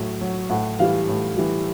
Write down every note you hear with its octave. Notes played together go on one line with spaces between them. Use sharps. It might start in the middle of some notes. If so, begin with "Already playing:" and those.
Already playing: A2 F#3
F#3
A2 F#5
E3 G3 F5
A2
E3 G3